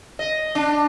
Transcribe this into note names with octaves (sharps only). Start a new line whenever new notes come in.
D#5
D4